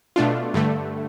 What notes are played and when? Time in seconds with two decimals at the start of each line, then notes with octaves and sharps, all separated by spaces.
0.16 B2 A3 D4 F4
0.54 G2 D3 A3